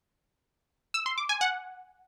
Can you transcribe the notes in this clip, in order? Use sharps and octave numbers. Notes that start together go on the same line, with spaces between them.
E6
C6
D6
G#5
F#5